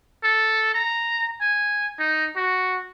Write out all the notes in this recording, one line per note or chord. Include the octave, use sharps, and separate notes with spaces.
A4
A#5
G#5
D#4
F#4